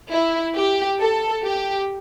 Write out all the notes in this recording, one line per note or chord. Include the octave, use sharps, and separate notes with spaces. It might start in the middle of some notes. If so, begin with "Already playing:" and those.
E4
G4
A4
G4